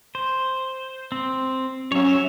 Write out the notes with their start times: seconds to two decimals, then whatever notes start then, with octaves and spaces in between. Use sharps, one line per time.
0.15 C5
1.12 C4
1.92 F#3 C#4 C#5 E5